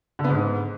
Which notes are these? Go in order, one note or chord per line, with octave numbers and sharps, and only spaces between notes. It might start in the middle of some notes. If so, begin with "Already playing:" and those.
D3
B3
G#2